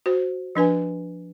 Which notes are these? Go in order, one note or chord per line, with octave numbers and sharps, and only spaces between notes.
F#4 C5
F3 D4 B4 G#5